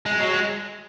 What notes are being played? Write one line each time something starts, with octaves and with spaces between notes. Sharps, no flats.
G#3
F#3
G#3